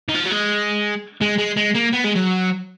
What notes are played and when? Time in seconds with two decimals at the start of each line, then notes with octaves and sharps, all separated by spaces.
0.09 D#3
0.14 F3
0.25 F#3
0.31 G#3
1.21 G#3
1.38 G#3
1.57 G#3
1.75 A#3
1.93 B3
2.04 G#3
2.16 F#3